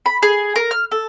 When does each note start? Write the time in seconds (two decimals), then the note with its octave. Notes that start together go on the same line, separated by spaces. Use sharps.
0.06 B5
0.22 G#4
0.56 A#4
0.71 F6
0.91 A4